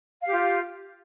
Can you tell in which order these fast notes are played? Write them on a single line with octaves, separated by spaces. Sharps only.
F5 G4 F4